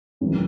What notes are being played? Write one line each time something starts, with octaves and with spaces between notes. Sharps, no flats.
E1 E2 D#3 F#3 A3 C#4